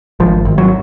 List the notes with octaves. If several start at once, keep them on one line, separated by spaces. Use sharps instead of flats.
G#1 F3
G#1
F#3